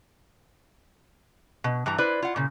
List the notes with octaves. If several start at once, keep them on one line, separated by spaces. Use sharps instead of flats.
B2
G2 E3 A#5
E4 B4 C5 D5
F4 F#5
A#2 C#3